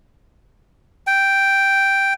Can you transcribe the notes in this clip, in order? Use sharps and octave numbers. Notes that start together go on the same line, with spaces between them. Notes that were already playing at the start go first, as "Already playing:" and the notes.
G5